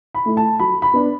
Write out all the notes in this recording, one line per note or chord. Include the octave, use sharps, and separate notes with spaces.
B5
A3 E4
A5
F#3 B5
B5
B3 D4